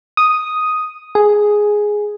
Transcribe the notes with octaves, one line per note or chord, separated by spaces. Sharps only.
D#6
G#4